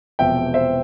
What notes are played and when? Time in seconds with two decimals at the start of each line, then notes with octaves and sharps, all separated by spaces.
0.19 E1 E2 C3 F3 E5 G5
0.54 C5 E5